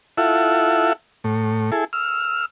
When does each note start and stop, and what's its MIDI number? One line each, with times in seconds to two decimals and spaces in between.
0.17 0.93 64
0.17 0.93 65
0.17 0.93 69
0.17 0.93 76
0.17 0.93 78
1.24 1.71 45
1.72 1.85 64
1.72 1.85 68
1.72 1.85 69
1.93 2.45 88
1.93 2.45 89